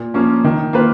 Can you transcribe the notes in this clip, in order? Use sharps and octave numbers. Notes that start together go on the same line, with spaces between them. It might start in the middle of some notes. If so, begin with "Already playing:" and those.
Already playing: A#2
F3 A#3 C#4
D#3
A#3 F4 B4